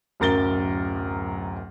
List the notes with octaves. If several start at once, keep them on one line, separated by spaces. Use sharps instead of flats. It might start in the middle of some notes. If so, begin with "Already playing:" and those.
D1 F#2 A#4 A6 G7